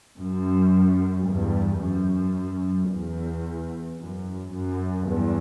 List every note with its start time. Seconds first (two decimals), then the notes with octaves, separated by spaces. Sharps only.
0.19 F#2
1.27 E2 G2
1.82 F#2
2.90 E2
3.99 F#2
4.53 F#2
5.07 E2 G2